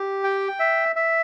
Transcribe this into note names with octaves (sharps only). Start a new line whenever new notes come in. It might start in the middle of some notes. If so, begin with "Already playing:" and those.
Already playing: G4
G5
E5
E5